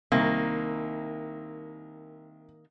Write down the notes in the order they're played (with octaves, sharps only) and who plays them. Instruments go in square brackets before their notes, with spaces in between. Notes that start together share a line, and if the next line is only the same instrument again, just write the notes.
[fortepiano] C2 [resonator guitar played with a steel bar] D#3 A#3